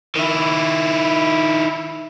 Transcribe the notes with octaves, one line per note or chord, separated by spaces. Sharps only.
D#3 E4